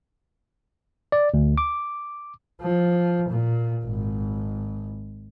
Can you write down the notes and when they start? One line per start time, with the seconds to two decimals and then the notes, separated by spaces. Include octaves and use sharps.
1.12 D5
1.34 D2
1.58 D6
2.61 F3
3.29 A#2
3.85 G#1